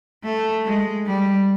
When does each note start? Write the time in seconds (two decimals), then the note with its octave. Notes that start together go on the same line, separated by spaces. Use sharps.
0.24 A3
0.65 G#3
1.06 G3